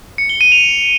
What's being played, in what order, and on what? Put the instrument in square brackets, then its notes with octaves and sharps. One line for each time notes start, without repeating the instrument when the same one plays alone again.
[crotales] C#7
G7
D#7
F7